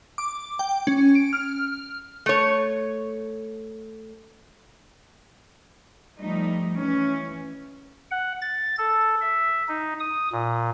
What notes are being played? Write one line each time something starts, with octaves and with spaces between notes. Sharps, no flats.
D6
G5
C#4
D7
F6
A3 C#5
F3 G3 A3 D#4
E3 C#4
F#5
A6
A4
E5
D#4
D#6
A#2